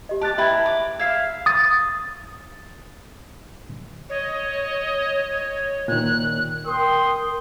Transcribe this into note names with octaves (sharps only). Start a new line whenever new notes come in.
G4 D#5
G4 A5 D6 F#6 A6
E4 B4 E5 G5 A#5 G#6
D6
E5 F5 G#6 C7
D#6 A6
C#5 D#5
A#2 D#3 F#6
A#4 G5 C6 D#6